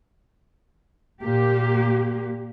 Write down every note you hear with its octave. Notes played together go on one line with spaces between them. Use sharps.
A#2 A#3 G4